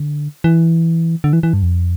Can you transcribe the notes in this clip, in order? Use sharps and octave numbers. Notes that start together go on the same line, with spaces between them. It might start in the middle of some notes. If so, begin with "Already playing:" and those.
Already playing: D3
E3
D3
E3
E3
G2
F2